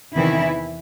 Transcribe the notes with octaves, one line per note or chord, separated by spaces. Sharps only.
E2 C3 D#3 E3 E4